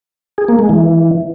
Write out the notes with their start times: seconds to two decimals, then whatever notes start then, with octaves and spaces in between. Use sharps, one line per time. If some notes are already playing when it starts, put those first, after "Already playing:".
0.38 G#4
0.48 A#3
0.59 G#3
0.69 E3